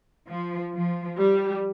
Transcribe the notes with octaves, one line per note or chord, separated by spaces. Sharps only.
F3
F3
G3